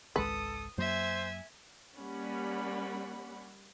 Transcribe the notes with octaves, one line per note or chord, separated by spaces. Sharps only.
G#1 C#2 G#3 A4 B4 D#6
F#2 F#3 A#3 C5 E5 G#5
G3 A#3 C#4 F#5 B5